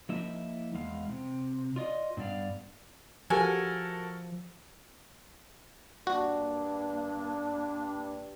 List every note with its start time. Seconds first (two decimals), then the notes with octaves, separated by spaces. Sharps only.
0.09 F3 A#3 D#4 E4 E5
0.74 E2 G#3 F5
1.09 C3
1.76 F4 D5 D#5
2.17 G2 B3 D5 F5
3.30 F3 F#4 G4 A4 A#4 G#5
6.07 G2 A#3 D4 F#4